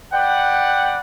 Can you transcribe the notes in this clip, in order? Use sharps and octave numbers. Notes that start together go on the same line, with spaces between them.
B4 D5 F#5 G5